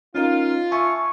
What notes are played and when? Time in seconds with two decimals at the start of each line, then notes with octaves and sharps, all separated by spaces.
0.15 C#4 D#4 F4 A#4
0.72 E5 G#5 A5 C#6